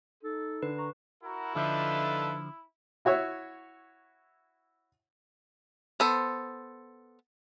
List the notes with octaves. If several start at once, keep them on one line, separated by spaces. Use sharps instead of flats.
D#4 A4
D3 B4
A#5 C#6
E4 F#4 A#4
D3 F3 D4 D#4 F4 A4 B4 E5
E4 F#4 C#5 E5
B3 A4 C5